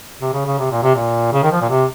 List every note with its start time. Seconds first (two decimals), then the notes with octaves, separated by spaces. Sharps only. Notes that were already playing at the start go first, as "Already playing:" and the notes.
0.21 C3
0.33 C#3
0.46 C#3
0.58 C3
0.71 A#2
0.83 C3
0.95 A#2
1.33 C#3
1.43 D#3
1.52 F3
1.61 A#2
1.70 C3